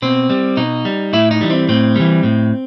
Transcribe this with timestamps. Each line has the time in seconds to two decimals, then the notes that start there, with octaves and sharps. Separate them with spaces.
0.02 B2 C4
0.30 G3
0.57 B2 D#4
0.85 G3
1.13 A2 E4
1.31 D#4
1.41 E3 G3
1.50 C4
1.69 A2 C4
1.96 E3 G3
2.23 A2